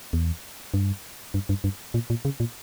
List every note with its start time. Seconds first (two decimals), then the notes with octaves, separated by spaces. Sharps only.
0.13 E2
0.74 G2
1.34 G2
1.49 G2
1.64 G2
1.94 A#2
2.10 A#2
2.25 C#3
2.40 A#2